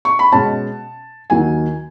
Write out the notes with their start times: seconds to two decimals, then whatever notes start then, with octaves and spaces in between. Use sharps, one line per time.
0.05 C#6
0.19 B5
0.32 B2 G#3 C#4 A5
1.30 D#2 D#3 F#3 G#5